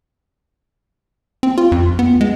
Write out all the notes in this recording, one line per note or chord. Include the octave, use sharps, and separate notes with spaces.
C4
F4
F2
B3
G#3